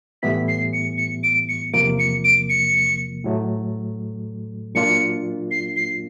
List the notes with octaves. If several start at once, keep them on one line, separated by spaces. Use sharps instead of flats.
A2 E3 G3 B3 E4 B6
C7
C#7
C#7
D7
C#7
E2 C3 F3 A#3 D7
C#7
D7
C#7
A2 F#3 A3
A#2 F#3 A#3 D4 F4 C#7
C7
C7